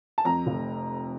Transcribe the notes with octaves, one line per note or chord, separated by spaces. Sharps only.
A5
F2 A#5
F1